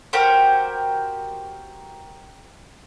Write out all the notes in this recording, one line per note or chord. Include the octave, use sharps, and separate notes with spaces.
F#4 G4 A#4 C5